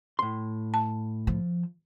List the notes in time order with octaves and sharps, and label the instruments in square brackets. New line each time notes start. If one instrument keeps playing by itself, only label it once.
[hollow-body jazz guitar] A2 C6
[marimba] A5
[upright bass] F3